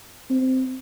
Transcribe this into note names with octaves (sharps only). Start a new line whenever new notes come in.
C4